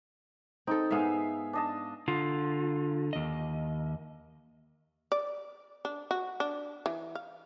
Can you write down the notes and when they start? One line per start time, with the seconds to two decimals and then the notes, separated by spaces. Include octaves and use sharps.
0.67 C4 D#4 A4
0.91 G#2 B3 E5 F5 G#5
1.53 D4 D#5 A5
2.08 D3 F4
3.13 D#2 D#5
5.12 D5
5.85 D4
6.11 F#4
6.40 D4
6.86 E3
7.15 F5